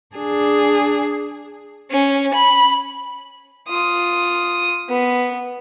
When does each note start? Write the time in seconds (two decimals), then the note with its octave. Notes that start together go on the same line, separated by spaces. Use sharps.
0.16 D4 G#4
1.91 C#4
2.34 B5
3.69 F4 D#6
4.89 B3